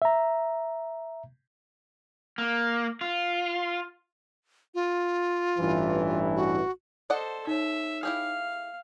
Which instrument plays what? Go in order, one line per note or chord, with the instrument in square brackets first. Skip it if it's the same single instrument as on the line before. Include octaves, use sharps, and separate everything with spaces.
[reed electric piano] E5 A#5
[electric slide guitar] A#3
F4
[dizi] F4
[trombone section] A1 G2 E3
[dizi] F#4
[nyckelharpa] A4 C5 [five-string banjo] D5 D#5 F#5
[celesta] D#4 C#5 [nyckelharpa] E5
[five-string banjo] E4 G4 G#4 [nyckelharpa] F5